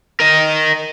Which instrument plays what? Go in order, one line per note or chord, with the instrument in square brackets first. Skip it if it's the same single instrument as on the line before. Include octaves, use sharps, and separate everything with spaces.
[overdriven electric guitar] A#4 D#5